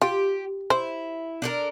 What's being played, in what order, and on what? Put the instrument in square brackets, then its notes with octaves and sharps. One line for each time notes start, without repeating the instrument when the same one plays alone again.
[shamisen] F4 [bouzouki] G4
[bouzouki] E4 [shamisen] C5
[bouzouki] D4 A4 A#4